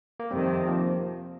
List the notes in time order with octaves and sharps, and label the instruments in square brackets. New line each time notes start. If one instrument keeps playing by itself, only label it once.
[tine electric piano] A#3
[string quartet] F2 C3 D#3 [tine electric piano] G3 C4
[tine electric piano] F3 A#3